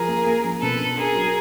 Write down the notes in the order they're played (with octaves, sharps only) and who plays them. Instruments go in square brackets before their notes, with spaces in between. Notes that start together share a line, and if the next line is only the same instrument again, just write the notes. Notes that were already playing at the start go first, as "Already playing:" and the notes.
Already playing: [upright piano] F3 [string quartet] G#4 A#4
[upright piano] A#3
A#3
F3
[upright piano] B2 [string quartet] A4 B4
[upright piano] D4
[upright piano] D4 [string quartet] G#4 A#4
[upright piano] F#3